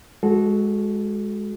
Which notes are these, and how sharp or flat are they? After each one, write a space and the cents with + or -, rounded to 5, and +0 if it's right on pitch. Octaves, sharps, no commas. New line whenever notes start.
G#3 +0 F#4 +0 A4 -20